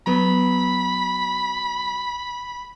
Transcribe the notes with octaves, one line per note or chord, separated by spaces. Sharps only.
F#3 B3 B5